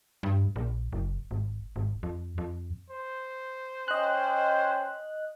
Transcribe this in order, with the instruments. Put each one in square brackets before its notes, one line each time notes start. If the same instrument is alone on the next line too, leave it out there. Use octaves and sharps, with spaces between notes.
[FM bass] G2
A#1
F#1
G#1
G#1
F2
F2
[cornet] C5
[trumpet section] C#4 G5 [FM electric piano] D#5 F#6